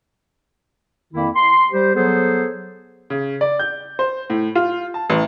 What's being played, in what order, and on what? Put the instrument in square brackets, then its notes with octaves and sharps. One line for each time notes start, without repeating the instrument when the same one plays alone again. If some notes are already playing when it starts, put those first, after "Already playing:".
[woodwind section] F2 D#3 A#3 E4
C6
G3 G4 C5
F#3 B3 G#4 A4 C5
[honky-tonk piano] C#3
D5
G6
C5
A2
F4
A5
A1